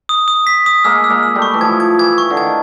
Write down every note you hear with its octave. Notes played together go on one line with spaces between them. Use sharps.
D#6
D#6
B6
D#6
G#3 A#3 E6
E6
G#3 A#3
E6
G3 A3
C#6
E3
F3 G#6
G#6
E3 G#6
C#6
D3
D#3 G#6